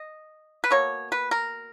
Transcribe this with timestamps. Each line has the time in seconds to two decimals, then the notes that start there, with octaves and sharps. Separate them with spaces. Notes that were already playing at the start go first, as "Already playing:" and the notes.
Already playing: D#5
0.64 B4
0.71 B2 A#3 C#5
1.12 B4
1.31 A#4